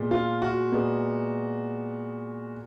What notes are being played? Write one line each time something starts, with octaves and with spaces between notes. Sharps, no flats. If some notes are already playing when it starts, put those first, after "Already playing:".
Already playing: A#2 G#3 B3
F4
F#4
A#2 G#3 B3